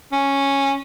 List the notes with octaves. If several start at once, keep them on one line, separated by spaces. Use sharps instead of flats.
C#4